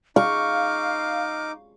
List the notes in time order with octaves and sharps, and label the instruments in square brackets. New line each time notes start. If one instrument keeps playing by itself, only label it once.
[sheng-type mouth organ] D#4 D6 [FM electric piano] F5 [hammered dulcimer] C#6 [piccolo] F6